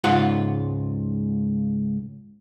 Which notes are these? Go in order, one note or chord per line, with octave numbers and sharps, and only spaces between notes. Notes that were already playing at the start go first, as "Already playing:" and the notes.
C#2 G#2 F4 F#5